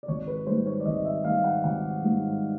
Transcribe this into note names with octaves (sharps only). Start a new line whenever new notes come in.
D5
G#1 C#5
B4
G#2 D#3 G3 C5
C#5
D5
G#1 D#5
E5
G#2 D#3 G3 F5
F#5
G#1 F#5
G#2 D#3 G3